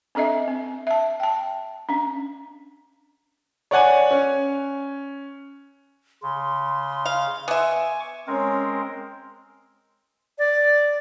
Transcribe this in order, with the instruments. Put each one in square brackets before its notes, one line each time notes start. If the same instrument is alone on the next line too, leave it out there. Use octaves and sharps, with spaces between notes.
[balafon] C4 D4 A4 D#5 E5
C4
E5 A5
G5 A5
C#4 D4
[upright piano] C#5 D5 F#5 G#5
C#4
[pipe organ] C#3 [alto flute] C6
[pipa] F5
[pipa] B3 E5 [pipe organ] G#5 C#6 D6
[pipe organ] G#3 C4 A#4 [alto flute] C#4
[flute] D5